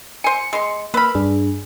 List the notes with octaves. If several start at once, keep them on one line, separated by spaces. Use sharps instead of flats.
C5 G#5 C#7
G#3 C6
A#3 B4 B5 E6 F6
G2 D4 G#4